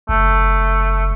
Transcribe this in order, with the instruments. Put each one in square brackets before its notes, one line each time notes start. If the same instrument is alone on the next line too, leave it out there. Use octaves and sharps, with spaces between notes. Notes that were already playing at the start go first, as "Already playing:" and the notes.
[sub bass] F#1 [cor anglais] A3